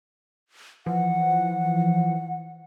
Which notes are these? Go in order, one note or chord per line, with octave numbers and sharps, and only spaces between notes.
E3 F3 F#5